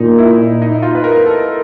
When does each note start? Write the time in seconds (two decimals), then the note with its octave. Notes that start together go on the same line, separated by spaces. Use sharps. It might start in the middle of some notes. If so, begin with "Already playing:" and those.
Already playing: A#2 D#4
0.18 E4
0.62 D#4
0.82 F4
0.95 B4
1.04 A#4
1.26 A4